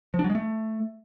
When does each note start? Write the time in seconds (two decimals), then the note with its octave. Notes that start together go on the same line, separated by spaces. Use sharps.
0.14 F3
0.19 D4
0.24 F#3
0.30 G#3
0.35 A3